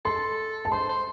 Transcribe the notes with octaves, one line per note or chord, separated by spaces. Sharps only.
A4 C6
A5
C5 C6
C5